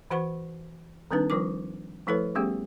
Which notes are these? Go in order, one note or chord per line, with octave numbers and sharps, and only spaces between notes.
E3 F#4 C5 F#5 B5 C#6
D#3 G3 C4 D4 D#4 B4
F3 G3 F4 A#4 D6
F3 A3 E4 A4 B4 C#5
G3 A3 B3 C#4 G4 G#4